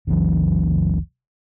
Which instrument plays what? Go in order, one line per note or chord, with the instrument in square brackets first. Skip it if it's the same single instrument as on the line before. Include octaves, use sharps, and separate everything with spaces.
[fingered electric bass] F#1 C#2 E3